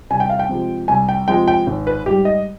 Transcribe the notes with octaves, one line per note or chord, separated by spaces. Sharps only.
C2 G#5
G5
F5
G5
C3 F3 G#3
C2 G#5
G5
C3 F3 G#3 G5
G5
G#1
B4
G#2 G3 G4
D#5